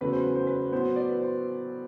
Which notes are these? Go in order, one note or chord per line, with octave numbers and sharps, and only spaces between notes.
E2 C#3 F#3 A3 B4
C5
B4
C5
B4
A2 F#3 B3 C5
D5
B4
C5